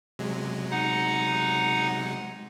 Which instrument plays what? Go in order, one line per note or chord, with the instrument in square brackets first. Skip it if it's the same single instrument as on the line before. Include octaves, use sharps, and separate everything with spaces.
[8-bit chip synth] C3 F#3 G#3
[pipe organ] D#4 F#5